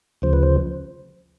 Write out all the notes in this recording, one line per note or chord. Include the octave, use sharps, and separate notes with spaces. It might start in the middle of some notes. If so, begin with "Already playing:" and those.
D2 C#3 F3 C5
B4
C5